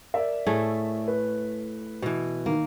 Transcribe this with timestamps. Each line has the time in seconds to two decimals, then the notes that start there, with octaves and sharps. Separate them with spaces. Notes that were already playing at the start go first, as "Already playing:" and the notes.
0.14 A#4 D5 E5
0.46 A2 A3 G#4
1.08 B4
2.02 B2 E3
2.46 D#3 A#3